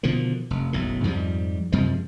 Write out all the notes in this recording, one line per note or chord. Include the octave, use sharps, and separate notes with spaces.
B2 D3 D#3 F3
F1
F#1 B1 A2
F2 G#2 F3 G3
F#2 C3 F3 G#3